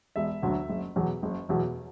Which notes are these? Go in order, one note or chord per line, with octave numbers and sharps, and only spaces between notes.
E1 E5
D2 D3 F#3
F#1
E2 B2 F#3
F#1
E2 B2 F#3